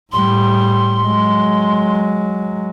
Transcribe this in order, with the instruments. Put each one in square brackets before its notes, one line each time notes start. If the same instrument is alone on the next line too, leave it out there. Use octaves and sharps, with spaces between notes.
[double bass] A2 G3 [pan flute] C6
[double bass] F#3 G#3